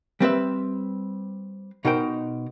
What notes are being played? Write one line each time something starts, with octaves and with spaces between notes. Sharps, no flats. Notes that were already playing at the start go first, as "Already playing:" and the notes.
G3 C4 B4 E5
B2 D#4 A#4 C5 G5